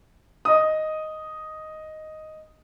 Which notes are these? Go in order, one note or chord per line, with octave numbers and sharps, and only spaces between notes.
D#5 D#6